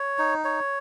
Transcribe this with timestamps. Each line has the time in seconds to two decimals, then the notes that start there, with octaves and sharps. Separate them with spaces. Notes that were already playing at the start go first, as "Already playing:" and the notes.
Already playing: C#5
0.18 D#4
0.44 C#5